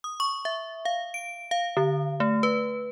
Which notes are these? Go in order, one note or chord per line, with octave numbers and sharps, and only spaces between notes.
D#6
C#6
E5
F5
D7
F5
D3
A3
B4